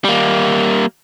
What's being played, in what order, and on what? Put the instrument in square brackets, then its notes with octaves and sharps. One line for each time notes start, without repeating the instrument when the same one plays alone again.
[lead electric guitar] G3 A#3